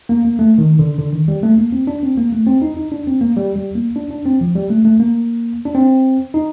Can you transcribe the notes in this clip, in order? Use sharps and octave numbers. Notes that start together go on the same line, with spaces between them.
A#3
A#3
A3
D#3
D3
D3
D#3
G3
A3
A#3
C4
D4
C4
A#3
A3
C4
D#4
D#4
D4
C4
A#3
G3
G3
A#3
D4
D4
C4
F3
G3
A3
A3
A#3
D4
C4
D#4